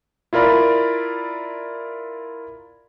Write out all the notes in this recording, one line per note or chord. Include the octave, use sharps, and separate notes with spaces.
E4 F4 A#4 D5 B5